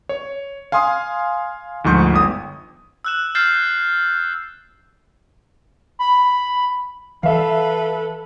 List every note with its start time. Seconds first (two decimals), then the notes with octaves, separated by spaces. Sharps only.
0.09 C#5
0.72 F5 G#5 C6 D#6
1.84 D2 G#2 F3 C#6 G6
2.14 G1 D#6
3.04 E6 F#6 E7
3.35 F6 G6 A6 C7 E7
5.99 B5
7.23 E3 A4 B4 E5 F5